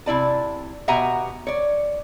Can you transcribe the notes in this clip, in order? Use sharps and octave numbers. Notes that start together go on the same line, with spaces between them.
C3 E4 D5 A5
B2 G4 E5 F#5 G#5 A#5
C#5 D5